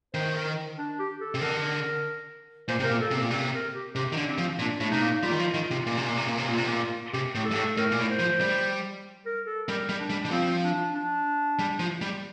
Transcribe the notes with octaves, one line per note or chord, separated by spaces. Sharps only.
D#3 C5
A#4
D4
G4
A4
C3
D3 A#4
A#2 C5
C3 A#4
A#2
A4
C3 C4
A#2
C3 C4
A#4
G4
C3 G4
D#3
D3
C4
F3
A#2 D4
A2
C3 D#4
A#2
G3 F4
D#3
F3
D#3
C3
A#2
C3
A#2
C3
A#2
C3
A#2 F4
C3
A#2
C3 G4
A2
A4
G2
A2
A2 A#4
A#2
A2
C5
F3
G3
A#4
A4
G3 A#4
G3
D4
G3
G3
F3 C4
D4
D4
G3
F3
G3